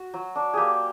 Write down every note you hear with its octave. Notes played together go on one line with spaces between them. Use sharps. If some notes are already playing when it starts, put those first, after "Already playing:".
Already playing: F#4
F#3
D4
A#3 G4 G#4